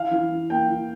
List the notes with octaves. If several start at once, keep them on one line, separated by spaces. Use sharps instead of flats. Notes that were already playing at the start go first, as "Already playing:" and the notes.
Already playing: E3 F5
E3
E3
A#3 G5
E3